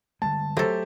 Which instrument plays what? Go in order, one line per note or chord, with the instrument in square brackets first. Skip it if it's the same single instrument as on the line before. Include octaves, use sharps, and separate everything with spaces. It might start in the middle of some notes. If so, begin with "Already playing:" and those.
[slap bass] D3 G3 G#3 [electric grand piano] A5
[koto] F#3 A4 [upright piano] A3 G4 C5